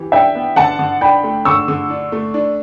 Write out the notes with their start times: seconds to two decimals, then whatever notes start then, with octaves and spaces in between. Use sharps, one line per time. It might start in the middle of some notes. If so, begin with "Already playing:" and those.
Already playing: E3 G4
0.12 D4 E5 G5
0.35 B3
0.56 D3 F#5 A5
0.79 D3
1.01 D4 G5 B5
1.24 A3
1.45 D3 C#6 E6
1.68 D3
1.90 D4
2.12 A3
2.34 D4